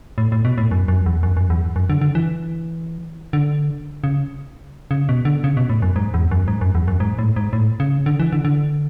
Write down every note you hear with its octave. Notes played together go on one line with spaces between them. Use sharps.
A2
A2
B2
A2
F#2
F#2
E2
F#2
F#2
E2
F#2
D3
D3
E3
D3
C#3
C#3
B2
D3
C#3
B2
A2
F#2
G#2
E2
F#2
G#2
F#2
E2
F#2
G#2
A2
G#2
A2
C#3
D3
E3
D3
D3